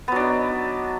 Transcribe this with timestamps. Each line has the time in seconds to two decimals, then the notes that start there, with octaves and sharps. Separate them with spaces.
0.08 B3
0.12 F#3
0.16 D4
0.20 D#4